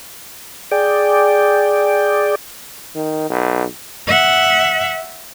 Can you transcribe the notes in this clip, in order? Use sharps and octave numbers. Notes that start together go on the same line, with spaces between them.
G#4 D5 G5
D#3
B1
E5 F#5